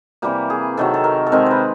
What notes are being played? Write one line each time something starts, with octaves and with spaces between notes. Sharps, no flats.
C3 E3 G3 A#3 G4
G#4
C3 D#3 F#3 A4
A4
A#4
A4
C3 D#3 G#3 C4 A#4
B4 C5